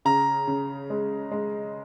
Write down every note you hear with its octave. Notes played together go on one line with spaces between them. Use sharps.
C#3 A#5
C#3
G#3
G#3